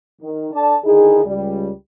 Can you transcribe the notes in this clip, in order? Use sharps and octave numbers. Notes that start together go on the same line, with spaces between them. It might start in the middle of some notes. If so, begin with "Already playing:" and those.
D#3
D4 A4 D5 A5
D3 D#3 D#4 E4 G#4
C#2 G3